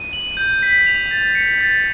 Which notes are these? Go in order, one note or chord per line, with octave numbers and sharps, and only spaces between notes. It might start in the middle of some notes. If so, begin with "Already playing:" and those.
Already playing: D#7
F#7
G6
B6
F7
A6
C#7
A6